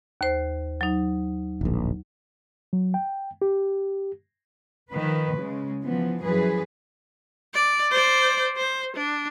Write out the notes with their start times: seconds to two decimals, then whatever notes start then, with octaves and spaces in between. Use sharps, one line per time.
0.21 D#2 C5
0.81 F#3 D#4
1.61 D1 A#1
2.73 F#3
2.94 G5
3.42 G4
4.91 D#3 F3 B4
5.37 C#3 G#3
5.82 E3 F3 B3
6.22 F#2 E3 F3 G#4 B4
7.54 D5
7.91 C5 D5
8.57 C5
8.96 D4